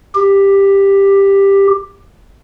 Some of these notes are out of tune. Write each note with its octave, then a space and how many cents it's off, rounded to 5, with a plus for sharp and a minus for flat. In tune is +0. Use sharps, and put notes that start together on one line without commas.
G4 +10